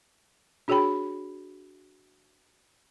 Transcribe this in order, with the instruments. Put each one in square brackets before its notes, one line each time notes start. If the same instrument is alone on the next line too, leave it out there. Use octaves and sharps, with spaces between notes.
[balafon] D4 F#4 G#4 C#5 G5 B5